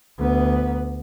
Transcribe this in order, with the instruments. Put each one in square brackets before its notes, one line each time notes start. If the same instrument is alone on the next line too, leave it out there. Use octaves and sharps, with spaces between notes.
[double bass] D2 B3